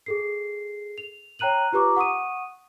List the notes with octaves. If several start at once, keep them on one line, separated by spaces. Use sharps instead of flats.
G#4 A4 C7
F7
C#5 G5 A#5 F#6 D#7 F#7
F4 G4 B4 A#5 C#6 D6
F#5 C#6 D#6 D#7